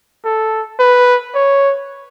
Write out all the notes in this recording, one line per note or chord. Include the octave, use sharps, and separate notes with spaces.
A4
B4
C#5